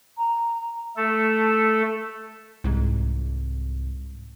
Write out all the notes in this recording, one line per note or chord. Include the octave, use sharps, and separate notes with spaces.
A#5
A3 A4
C2 G#2